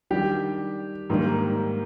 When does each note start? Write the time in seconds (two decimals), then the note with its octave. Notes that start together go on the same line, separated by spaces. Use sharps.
0.10 D#3 G3 D4 G4
1.10 G#2 D#3 G3 A#3